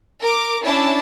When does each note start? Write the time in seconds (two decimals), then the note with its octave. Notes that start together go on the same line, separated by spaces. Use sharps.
0.22 A#4 D6
0.63 C#4 D4 E4 A5